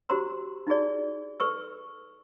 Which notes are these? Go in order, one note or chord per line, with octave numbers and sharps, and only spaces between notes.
F#4 G4 C5 A#5 C6 E6
D#4 E4 F#4 G#4 D5
A4 B4 C#6 E6